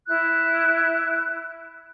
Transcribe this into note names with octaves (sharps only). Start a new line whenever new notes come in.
E4 F#6